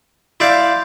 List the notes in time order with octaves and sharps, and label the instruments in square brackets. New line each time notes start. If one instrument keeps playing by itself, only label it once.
[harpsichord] E4 D5 F5 [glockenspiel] C6 G6